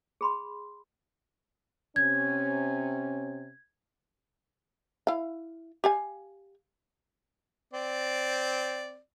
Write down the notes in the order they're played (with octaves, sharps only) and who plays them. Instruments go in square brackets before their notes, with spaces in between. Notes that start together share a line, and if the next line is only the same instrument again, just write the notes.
[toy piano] G#4 B5 C6
[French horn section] C3 C#4 [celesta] G#6
[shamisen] E4 F5
G4 F5 G#5
[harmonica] C4 D5